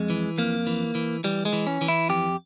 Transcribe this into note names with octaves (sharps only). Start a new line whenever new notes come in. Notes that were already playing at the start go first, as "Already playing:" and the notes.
Already playing: F2 G#3
E3
F2 A#3
E3
E3
E3 G3
G#3
E3
C#4
E3
E4
F2 G4